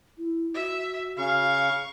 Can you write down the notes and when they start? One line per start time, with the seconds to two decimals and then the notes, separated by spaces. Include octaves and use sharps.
0.18 E4
0.54 F#4 E5
1.18 C#3 F5 C#6